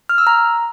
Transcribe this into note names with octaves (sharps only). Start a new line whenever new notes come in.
F6
E6
A#5